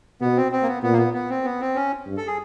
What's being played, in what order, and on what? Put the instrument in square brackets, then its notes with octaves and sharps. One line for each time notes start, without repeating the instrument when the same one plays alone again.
[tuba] B2 [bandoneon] B3
[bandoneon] C4
C4
A#3
B3
[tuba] A#2 [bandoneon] B3
[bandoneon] A#3
B3
B3
C4
B3
C4
C#4
[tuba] G2
[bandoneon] A4
G#4